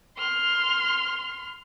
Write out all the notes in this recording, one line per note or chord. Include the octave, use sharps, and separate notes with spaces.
C6 F6